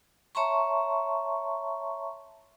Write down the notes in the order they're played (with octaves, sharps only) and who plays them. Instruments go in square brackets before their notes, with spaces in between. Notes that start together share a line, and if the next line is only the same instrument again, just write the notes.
[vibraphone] C#5 E5 A5 A#5 C6 C#6